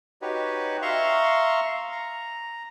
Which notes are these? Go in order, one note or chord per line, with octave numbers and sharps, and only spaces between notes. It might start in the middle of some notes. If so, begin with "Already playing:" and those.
D#4 F#4 G4 B4 C#5
E5 F5 A#5 C6 C#6
A#5